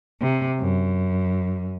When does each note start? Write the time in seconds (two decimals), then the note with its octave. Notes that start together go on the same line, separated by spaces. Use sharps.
0.22 C3
0.61 F#2